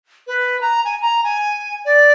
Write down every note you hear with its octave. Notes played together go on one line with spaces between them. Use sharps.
B4
A#5
G#5
A#5
G#5
D5